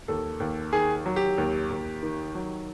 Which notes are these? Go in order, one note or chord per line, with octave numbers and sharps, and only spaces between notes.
D#2 A4
D#2
D#3 G#4
F#3
G4
D#2
D#2
D#3
F#3